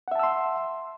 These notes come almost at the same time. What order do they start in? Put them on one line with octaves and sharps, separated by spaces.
F#5 E5 A5 E6 C6